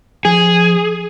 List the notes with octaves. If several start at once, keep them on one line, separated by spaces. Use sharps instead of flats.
F3 G#4